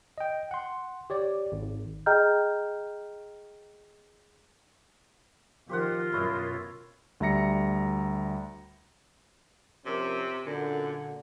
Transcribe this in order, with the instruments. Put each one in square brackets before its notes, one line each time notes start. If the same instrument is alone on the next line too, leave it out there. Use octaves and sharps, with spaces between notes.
[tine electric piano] D#5 G5
F#5 C6
G4 C#5 D5
G#1
[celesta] G#4 D#5 G5 A#5 F6 G6
[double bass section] D#3 F3 [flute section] F4 A#4 [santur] G4 C5 F#5
[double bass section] F#2 B2 [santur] E4 C#5 D#5
[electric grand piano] D2 G3 E5 A#5 A#6 C#7
[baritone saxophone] C3 [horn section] F3 C#4 A#4
[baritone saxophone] F#2 [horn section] A#2 D3